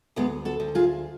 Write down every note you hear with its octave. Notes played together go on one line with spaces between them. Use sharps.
D2 G#3 B3
F#4 A4
D2
F4 G#4